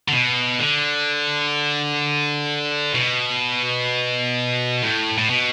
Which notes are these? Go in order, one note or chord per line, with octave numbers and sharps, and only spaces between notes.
D3
B2
D3
B2
A2
A2
B2